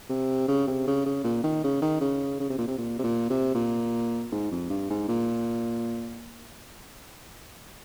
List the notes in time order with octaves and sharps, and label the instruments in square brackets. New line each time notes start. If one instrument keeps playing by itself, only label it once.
[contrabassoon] C3
C#3
C3
C#3
C#3
A#2
D#3
C#3
D#3
C#3
C#3
C3
A#2
C3
A#2
C3
A#2
C3
A#2
G#2
F2
G2
G#2
A#2